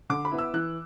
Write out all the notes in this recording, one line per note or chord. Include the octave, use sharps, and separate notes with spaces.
D3 D6
B5
B3 E4
E6
E3 F#6